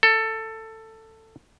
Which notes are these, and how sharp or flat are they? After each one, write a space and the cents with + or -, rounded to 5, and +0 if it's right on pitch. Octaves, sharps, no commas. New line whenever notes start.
A4 +15